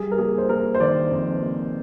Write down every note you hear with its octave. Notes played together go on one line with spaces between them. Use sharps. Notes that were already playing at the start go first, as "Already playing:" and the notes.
Already playing: G3 G#4
A#4
A#3 G#4
C5
A#3 A#4
C5
D#3 D5
F2
A#3